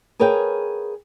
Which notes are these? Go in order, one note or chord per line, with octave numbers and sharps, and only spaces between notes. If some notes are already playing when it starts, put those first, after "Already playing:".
G#4 A#4 B4 C#5 F5 G5